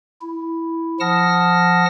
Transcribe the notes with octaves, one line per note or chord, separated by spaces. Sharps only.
E4
F3 F#5 A5 D#6 F6 A#6